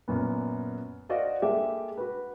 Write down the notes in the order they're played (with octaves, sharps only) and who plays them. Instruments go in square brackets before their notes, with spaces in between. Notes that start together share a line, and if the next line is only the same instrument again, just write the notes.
[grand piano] F#2 A#2 B3
F#4 C5 D5 D#5 F5
G#3 A#3 G4 A4 E5
F#4 B4